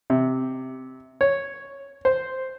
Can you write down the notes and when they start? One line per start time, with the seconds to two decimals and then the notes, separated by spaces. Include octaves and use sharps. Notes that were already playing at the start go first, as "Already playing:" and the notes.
0.10 C3
1.21 C#5
2.05 C5